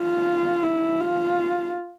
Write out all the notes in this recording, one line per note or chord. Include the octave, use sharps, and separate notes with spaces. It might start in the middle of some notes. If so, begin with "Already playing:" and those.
Already playing: F4
E4
F4